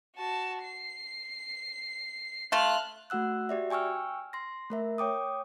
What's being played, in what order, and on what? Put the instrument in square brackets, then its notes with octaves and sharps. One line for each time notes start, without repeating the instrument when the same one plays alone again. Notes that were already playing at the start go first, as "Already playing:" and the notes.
[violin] F#4 A5
C7
[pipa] A3 F4 [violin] F6 F#6
[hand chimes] A3 F#4 F#5 E6 F#6
F#4 G4 D5 E5
G5 G#5 C#6 E6 F6
C6 A#6
A3 A#4 E5
C#5 G5 D6 D#6